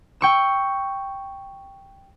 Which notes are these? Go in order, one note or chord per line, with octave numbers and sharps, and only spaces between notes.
G5 C#6 E6